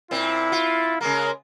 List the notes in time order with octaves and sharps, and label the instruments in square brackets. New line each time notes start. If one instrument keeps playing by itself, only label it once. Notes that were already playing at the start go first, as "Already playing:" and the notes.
[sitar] A#2 C4 [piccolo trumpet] E4
[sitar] F4
[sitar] C#3 G#3 A#3 [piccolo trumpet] A#4